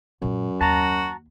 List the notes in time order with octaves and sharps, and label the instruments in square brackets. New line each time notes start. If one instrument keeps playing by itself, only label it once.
[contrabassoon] F#2 [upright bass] A#2 G#3
[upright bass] D#2 [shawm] F#4 [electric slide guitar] A5 A#5